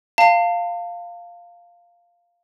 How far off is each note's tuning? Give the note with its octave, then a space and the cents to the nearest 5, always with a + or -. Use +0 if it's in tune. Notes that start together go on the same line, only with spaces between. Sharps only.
F5 +0 A5 +35